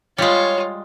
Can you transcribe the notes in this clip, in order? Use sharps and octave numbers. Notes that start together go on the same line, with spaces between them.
G3 G#3 F4 C#5